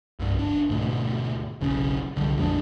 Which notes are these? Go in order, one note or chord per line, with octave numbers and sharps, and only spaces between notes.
C2 G2
F#1 D4
D2 G#2 B2
F#1 B1 C#3
C2 D3 G3
A#1 F2 G#3 D4